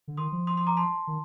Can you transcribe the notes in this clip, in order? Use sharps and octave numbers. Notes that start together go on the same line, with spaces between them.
D3
D#3 C6 D#6
F3
C6 D#6
C6 D#6
A#5 D6
A5 C6
D#3